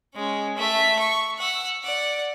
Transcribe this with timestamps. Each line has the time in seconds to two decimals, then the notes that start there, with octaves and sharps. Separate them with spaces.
0.15 G#3 C#4
0.57 A3 E5
0.99 C#6
1.38 F#5 E6
1.84 D5 F#5